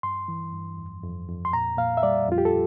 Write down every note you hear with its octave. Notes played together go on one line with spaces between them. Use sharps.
G2 C6
E3
G2
F2
F2
F2
C6
A#2 A#5
A#2 F5
E5
G3 D5
F2 F4
G4
A4